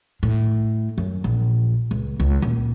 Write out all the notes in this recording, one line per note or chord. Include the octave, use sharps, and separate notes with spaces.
A2
F#2
A#1
C#2
C#2
D#1